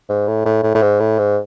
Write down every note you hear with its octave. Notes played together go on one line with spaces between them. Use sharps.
G#2
A2
A2
A2
A2
G#2
A2
G#2